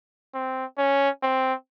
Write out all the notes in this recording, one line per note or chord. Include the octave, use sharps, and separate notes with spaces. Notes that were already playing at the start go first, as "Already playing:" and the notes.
C4
C#4
C4